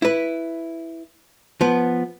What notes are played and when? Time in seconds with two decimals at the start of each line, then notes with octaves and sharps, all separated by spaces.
0.02 E4 B4
1.61 F3 B3